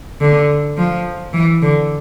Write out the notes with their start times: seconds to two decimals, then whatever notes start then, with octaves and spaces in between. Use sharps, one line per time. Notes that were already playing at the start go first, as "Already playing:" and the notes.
0.20 D3
0.77 F3
1.33 E3
1.62 D3